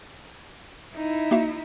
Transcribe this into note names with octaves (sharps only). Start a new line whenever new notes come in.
D#4 E4
A#3 F#4 E5